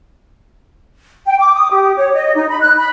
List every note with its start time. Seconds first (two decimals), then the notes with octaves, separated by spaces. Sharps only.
1.26 G5
1.39 D6
1.55 D#6
1.71 G4
1.97 C#5
2.14 D#5
2.36 D#4
2.49 B5
2.61 F#6
2.77 B5